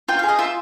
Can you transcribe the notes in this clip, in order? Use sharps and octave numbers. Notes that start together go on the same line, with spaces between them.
F4 G5
F5
G#4
D#5
F4 E5